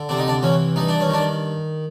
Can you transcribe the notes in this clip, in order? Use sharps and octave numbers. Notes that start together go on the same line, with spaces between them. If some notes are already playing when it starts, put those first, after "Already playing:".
Already playing: D3
C3 D4
D#4
D4
E3 C#4
G2 D#4
D4
C#4
D#3 D4